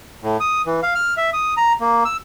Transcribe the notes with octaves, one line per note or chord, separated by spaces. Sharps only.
A2
D#6
E3
F5
F6
E5
D#6
A#5
A#3
E6